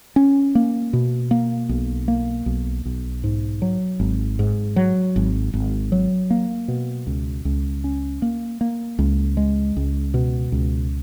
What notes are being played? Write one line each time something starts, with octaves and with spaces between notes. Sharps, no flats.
C#4
A#3
B2
A#3
B1
A#3
B1
B1
G#2
F#3
G#1
G#2
F#3
G#1
G#1
F#3
A#3
B2
C#2
C#2
C#4
A#3
A#3
C#2
G#3
C#2
B2
C#2